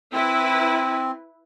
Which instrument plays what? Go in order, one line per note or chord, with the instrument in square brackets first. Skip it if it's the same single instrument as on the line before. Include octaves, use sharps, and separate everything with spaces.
[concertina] C4 [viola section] E4 B4